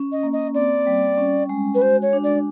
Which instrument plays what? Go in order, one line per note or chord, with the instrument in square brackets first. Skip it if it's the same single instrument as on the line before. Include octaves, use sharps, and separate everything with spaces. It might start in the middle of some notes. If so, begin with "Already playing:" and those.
Already playing: [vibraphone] C#4
[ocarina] D#5
[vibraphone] A#3
[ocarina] D#5
[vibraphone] C4 [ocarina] D5
[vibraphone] G3
C#4
G#3
[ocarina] B4
[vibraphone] F#4 [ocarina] C5
[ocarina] C#5
[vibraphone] D4
[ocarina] D5